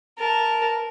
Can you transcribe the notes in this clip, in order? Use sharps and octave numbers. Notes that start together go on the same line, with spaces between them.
A#4 A5